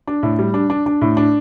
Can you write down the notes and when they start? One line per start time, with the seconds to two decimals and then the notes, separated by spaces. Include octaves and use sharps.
0.07 D4
0.23 A2
0.39 G3
0.54 D4
0.70 D4
0.86 D4
1.01 A2
1.17 D4